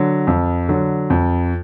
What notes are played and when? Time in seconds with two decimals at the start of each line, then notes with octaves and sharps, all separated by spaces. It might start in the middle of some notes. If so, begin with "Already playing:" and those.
Already playing: D3 F#3
0.27 F2
0.69 D3 F#3
1.10 F2